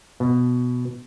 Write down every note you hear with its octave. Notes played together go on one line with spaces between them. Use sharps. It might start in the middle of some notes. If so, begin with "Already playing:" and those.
B2